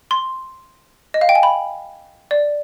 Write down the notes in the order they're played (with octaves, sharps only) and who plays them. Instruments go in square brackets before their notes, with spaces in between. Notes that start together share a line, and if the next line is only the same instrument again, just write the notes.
[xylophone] C6
D#5
F5
G5
G#5
B5
D5